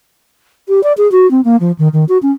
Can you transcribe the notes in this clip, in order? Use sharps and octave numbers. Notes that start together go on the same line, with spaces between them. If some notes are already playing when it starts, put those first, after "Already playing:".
G4
D5
G#4
F#4
C4
A#3
F3
D#3
D#3
F#4
C#4